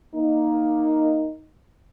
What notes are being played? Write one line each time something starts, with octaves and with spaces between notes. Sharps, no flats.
A#3 D#4